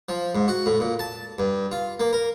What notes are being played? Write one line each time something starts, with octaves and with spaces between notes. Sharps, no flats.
F3
G#2
F#4
A2
A#2
A5
G2
F4
A#3
A#4